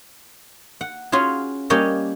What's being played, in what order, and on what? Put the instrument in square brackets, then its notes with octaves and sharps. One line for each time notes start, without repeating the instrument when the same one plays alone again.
[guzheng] F#5
C#4 F4 F#4 G#4
G3 A#3 C#4 G4 C#5 D#5